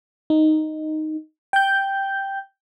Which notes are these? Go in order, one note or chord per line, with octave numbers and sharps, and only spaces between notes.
D#4
G5 G6